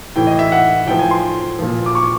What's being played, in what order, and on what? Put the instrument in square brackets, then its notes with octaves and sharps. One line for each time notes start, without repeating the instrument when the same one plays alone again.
[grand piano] A2 E3 G5
D#5
E5
F#5
A2 F3 G5
G#5
C6
A#2 F3
D6
C#6